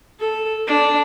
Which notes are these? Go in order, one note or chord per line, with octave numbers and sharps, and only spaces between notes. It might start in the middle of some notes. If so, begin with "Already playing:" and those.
A4
D4